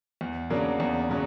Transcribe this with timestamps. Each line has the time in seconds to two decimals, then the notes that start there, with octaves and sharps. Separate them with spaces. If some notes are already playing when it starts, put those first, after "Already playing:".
0.21 E2
0.50 C#3 F#3 A#3 D4
0.80 E2
1.10 C#3 F#3